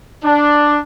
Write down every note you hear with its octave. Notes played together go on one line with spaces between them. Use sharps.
D4